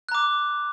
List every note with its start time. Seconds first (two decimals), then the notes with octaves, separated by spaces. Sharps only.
0.09 F#6
0.12 A#5
0.15 D6